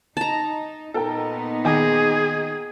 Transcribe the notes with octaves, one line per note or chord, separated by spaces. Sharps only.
D#4 A5 A#5
A#2 B3 D#4 A4 A#4 G5
D#3 G#4 G#5 D6